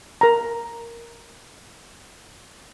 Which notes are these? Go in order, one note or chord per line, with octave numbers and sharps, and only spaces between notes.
A#4 A#5